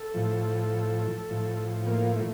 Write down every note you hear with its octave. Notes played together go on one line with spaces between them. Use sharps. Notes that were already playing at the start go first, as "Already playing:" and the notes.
Already playing: A4
A2 F3
A2 F3
A#3
A3